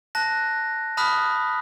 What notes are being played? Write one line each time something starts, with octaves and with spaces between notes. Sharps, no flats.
A5 F#6 A#6
A5 B5 D#6 F6 F#6 B6